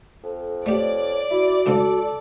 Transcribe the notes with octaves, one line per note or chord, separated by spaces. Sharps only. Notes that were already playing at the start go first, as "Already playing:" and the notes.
F2 A4
A3 G4 C#5 D5
E4 F#4
G#2 C#3 D4 A4